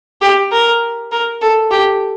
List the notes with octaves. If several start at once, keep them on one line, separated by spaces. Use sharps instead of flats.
G4
A#4
A#4
A4
G4